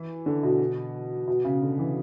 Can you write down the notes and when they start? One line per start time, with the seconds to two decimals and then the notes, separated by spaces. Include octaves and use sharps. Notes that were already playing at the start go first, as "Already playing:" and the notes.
Already playing: E3
0.26 D3
0.43 B2
1.28 B2
1.45 C#3
1.62 D3
1.79 E3